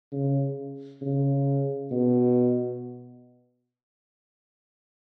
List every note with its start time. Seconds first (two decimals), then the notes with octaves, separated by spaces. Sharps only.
0.12 C#3
1.02 C#3
1.91 B2